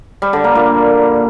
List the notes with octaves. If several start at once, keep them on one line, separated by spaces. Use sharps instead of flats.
G3
D3
A#3
A#2